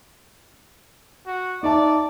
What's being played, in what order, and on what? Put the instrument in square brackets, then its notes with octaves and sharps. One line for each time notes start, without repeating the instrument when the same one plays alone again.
[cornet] F#4
[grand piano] D#4 E5 A5 [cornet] D5